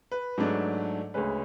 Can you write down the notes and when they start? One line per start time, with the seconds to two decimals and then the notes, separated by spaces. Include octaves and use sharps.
0.12 B4
0.37 G#2 F#3 A3 D4
1.14 D2 C#3 G#3 C#4 B4